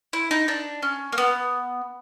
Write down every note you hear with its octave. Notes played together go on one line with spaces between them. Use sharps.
E4
D#4
D4
C#4
A#3
B3